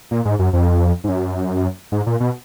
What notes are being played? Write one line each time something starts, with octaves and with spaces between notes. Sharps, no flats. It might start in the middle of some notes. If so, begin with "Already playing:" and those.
A#2
G#2
F#2
F2
G#2
F#2
G#2
A#2
B2